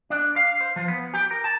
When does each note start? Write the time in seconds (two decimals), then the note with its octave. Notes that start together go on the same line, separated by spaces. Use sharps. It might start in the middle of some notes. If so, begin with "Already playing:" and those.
0.10 D4
0.36 F5
0.61 C5
0.76 F3
0.88 B3
1.14 G4
1.31 A#4
1.44 A5